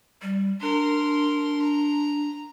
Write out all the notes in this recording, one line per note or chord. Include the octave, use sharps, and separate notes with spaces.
G3
D4 A#4 C6
A#5